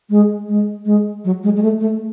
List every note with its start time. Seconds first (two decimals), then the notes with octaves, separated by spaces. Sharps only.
0.10 G#3
0.49 G#3
0.86 G#3
1.25 F#3
1.44 G#3
1.56 G#3
1.63 A3
1.80 A3